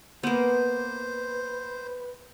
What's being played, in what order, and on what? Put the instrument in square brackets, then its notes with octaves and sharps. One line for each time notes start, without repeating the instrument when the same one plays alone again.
[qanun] A#3 B3 [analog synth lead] B4 [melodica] C5